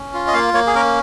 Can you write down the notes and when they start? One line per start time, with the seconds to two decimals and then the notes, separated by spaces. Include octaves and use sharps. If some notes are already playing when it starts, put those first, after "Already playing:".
Already playing: C#4
0.14 F4
0.27 D#5
0.34 A#3 F5
0.54 A#3 C#5
0.67 G#4
0.75 C#4 A#4